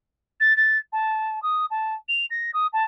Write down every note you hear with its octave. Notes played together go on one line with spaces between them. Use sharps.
A6
A6
A5
D#6
A5
F7
A#6
D#6
A5